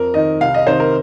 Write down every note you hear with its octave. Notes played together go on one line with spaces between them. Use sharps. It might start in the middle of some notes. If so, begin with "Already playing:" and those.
Already playing: F2 A#4
D#3 D#5
C2 F5
D#5
C3 D#3 C5
A#4